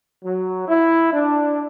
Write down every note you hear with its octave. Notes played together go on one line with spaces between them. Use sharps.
F#3
E4
D4